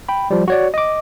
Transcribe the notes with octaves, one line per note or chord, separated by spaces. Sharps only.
G5 B5
F3 G3
F#4 C#5 D5
D#5 D6